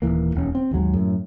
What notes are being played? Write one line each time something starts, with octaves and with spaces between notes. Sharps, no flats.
D#1 C#2 E3 A#3
E1 D#2 C#4
C4
G#1 D#2 F#3 G#3
F#2 A2